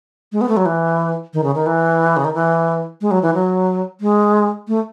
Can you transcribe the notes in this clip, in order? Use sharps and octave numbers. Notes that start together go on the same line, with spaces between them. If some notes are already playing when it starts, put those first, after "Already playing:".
G#3
B3
A3
F#3
E3
D#3
C#3
D#3
E3
C#3
D#3
E3
G#3
F#3
E3
F#3
G#3
A3